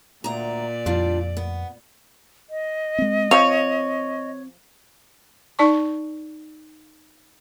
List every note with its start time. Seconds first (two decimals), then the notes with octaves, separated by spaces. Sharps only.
0.24 D2 A#2 D5 A#5
0.86 F2 G3 D4 F4
1.37 B3
2.50 D#5
2.98 G#3 C4
3.31 F3 C4 C5 C#5 F5
5.59 D#4 D5 A5 C#6